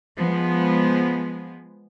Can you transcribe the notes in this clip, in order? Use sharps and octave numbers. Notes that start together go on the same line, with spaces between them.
F3 G#3 B3